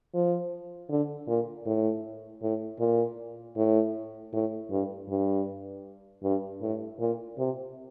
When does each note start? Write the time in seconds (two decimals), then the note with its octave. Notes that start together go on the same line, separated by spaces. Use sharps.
0.14 F3
0.89 D3
1.27 A#2
1.66 A2
2.42 A2
2.80 A#2
3.56 A2
4.33 A2
4.71 G2
5.09 G2
6.23 G2
6.62 A2
6.99 A#2
7.38 C3